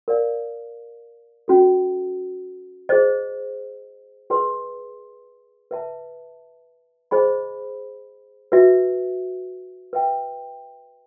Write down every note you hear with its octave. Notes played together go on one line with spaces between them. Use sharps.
A#4 D5 F5
C#4 F#4 A4
G#4 C5 D#5
G#4 B4 D#5 G#5 C6
B4 E5 A5
G#4 C5 D#5 G#5 B5
F#4 B4 E5
B4 E5 G5